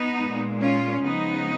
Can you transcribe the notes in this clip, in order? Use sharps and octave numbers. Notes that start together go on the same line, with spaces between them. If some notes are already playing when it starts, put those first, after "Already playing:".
Already playing: B3 D#4
A#2 G#3
C#4 F4
C#3 F3 G#3 B3 D#4